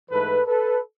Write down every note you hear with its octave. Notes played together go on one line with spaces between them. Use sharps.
G#2 E3 A3 A4 B4
A4 B4